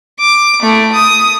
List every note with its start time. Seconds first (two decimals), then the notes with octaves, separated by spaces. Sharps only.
0.20 D6
0.62 A3 E4
0.92 D#6